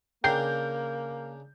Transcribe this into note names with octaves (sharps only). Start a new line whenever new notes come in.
C#3 A#3 D4 A#4 G5 G6 C7